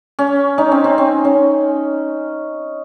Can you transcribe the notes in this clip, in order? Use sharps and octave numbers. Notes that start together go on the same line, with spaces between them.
C#4
C#4 D#4
C4
C4
C#4
C#4